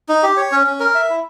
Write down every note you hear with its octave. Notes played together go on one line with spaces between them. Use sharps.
D#4
G4
C#5
C#4
C#4
A#4
E5
E4